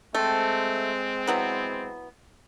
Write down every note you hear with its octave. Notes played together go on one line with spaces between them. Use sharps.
G#3 A3 C4
E3 F#3 B3